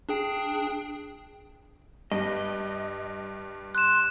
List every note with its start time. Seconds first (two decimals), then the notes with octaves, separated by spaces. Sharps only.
0.09 D4 G#4 G5
2.12 G2 D#5
3.75 C6 F#6 E7